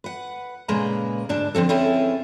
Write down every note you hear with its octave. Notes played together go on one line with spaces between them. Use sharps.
B4 F#5
A#2 C#3 G#3 A#3 B4 A#5
D2 G#2 D4 A5
D3 F3 C4 A4
C4 C#4 E4 G#4 A4 B4